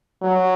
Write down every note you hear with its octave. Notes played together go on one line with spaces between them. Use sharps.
F#3